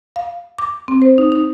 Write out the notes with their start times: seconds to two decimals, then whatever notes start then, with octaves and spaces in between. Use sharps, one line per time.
0.16 F5
0.58 D6
0.88 C4
1.02 C5
1.18 D#4
1.32 D#4